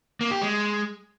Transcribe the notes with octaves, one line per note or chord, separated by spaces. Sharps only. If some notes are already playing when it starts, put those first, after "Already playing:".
A#3
G4
G#3